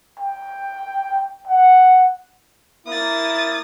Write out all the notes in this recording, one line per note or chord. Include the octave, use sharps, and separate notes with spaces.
G5
F#5
A#3 E4 D#6 A6